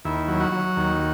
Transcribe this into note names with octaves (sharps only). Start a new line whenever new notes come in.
D#2 E4
F#3
F#4
F#3
D#2